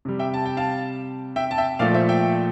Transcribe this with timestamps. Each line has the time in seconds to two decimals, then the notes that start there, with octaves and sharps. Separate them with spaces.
0.05 C3 G3
0.19 E5 G5
0.34 A5
0.45 G5
0.57 F5 A5
1.36 E5 G5
1.51 A5
1.58 E5 G5
1.79 A#2 F3 A3 D5 F5
1.94 C5 E5
2.09 E5 G5